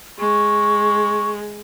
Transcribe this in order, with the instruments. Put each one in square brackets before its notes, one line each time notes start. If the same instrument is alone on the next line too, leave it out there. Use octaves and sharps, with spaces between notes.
[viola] G#3 [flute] C#6